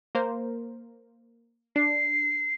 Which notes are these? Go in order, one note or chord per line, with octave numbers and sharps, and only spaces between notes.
A#3 A#4 C5
D4 C7